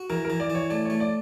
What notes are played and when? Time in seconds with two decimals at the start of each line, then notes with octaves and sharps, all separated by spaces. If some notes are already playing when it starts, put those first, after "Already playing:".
Already playing: F#4
0.10 E3 A#4
0.25 A#4
0.30 E3
0.40 D5
0.50 E3 C#5
0.70 A3 D5
0.85 A3 C#5
1.00 D5